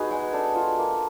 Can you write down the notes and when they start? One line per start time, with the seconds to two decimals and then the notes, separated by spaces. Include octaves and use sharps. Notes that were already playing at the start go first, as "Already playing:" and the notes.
Already playing: B3 D#4 F#4 G#4
0.11 G#3
0.33 D4 A4
0.55 F4
0.78 A#3